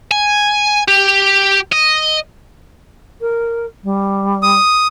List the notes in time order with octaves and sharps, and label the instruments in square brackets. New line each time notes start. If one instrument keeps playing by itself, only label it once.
[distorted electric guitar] G#5
G4
D#5
[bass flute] A#4
G3
[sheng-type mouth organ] D#6